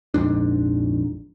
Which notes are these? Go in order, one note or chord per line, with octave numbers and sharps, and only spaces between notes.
A#1 F2 G#2 D4